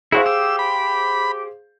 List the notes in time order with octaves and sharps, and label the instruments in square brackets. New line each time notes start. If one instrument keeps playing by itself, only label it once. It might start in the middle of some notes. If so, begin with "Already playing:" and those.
[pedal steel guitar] E4 F#4 [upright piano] G#4 C5 F5
[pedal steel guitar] G4 [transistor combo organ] E6
[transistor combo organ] B5